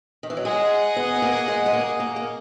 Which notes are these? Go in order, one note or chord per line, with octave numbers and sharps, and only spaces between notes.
D#3
E3
F#3
G#3 G#4 D#5 F#5
B3
B3
A#3
G#3
G#3
A#3
A#3
A#3